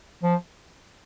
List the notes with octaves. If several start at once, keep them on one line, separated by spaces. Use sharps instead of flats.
F3